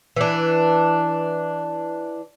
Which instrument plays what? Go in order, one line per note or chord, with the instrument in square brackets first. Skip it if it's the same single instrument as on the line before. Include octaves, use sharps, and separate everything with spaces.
[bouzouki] E3 D4